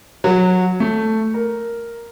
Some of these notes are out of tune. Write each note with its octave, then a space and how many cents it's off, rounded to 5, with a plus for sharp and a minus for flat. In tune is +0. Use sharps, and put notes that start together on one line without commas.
F#3 -15
A3 +5
A#4 +0